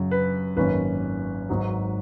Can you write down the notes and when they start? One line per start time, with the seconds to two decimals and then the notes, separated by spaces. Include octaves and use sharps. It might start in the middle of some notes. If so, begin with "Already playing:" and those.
Already playing: F#2 C#3 F#3
0.11 B4
0.57 G#1 F#2 D#3 A#3 C#4 B4
1.49 G#1 G#2 F#3